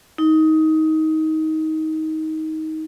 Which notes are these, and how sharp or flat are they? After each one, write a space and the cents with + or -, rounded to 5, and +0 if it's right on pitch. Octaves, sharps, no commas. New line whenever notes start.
D#4 +20